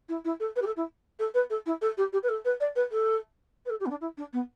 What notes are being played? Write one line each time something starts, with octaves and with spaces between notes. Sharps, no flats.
E4
E4
A4
B4
G4
A4
E4
A4
B4
A4
E4
A4
G4
G4
B4
A4
B4
D5
B4
A4
B4
A4
G4
B3
D4
E4
D4
B3